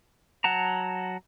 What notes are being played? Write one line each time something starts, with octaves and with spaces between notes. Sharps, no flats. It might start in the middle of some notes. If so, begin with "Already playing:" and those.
F#3 F#5 A5 A#5